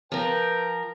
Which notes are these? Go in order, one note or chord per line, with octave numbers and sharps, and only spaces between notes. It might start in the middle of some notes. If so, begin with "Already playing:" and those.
F3 A#4 B4 G5